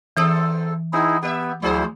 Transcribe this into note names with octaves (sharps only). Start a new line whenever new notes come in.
E2 E3 C4 A4 D#6 E6
B3 D#4 E4 G#4
B3 G4 D#5 E5
D2 F3 E4 G#4 C5